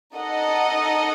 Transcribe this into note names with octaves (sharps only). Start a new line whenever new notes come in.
D#4 A4 D#5 F#5